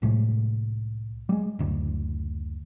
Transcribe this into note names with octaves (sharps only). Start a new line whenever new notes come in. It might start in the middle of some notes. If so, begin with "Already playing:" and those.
C2 A2 C3 G#3
G3 G#3
F#1 D2